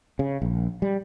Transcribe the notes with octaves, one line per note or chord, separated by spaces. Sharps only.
C#3
A#1
G3